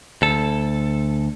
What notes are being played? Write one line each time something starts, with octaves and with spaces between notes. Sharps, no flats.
D2 A4